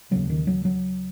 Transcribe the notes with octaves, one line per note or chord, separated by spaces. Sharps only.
D#2 C#3 F#3
D#3
F#3
F#3